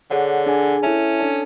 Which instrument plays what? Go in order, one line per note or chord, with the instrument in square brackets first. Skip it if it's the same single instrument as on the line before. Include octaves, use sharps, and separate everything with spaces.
[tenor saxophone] D3 [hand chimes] G#4 C#5 F#5
[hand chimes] D4 G#4 D5 G#5
[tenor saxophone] C#4 [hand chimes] E4 A4 E5 A5
[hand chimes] D4 A4 D5 A5